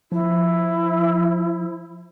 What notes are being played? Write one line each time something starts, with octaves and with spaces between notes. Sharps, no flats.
F3 E4